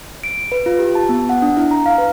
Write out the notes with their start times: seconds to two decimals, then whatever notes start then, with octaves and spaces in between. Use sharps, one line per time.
0.24 D7
0.52 B4
0.66 F4
0.79 G4
0.95 A5
1.09 B3
1.29 F#5
1.42 D4
1.57 E4
1.71 A#5
1.86 F5
1.98 B4